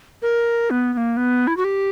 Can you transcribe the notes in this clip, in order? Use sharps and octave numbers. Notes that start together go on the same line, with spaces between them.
A#4
B3
B3
A#3
B3
E4
F#4
G4